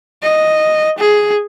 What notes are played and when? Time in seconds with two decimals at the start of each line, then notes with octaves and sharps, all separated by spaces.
0.22 D#5
0.99 G#4